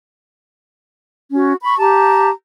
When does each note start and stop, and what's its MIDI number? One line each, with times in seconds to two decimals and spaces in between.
1.32 1.54 61
1.32 1.54 66
1.63 1.74 83
1.63 1.74 85
1.78 2.29 67
1.78 2.29 81
1.78 2.29 82